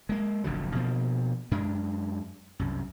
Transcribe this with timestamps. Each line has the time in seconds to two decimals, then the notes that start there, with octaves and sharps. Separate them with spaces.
0.09 G#3 A#3
0.44 F1 A#1 D3 F#3
0.75 B2 F3 A#3
1.51 F#2 G#3 D4
2.59 C2 F#2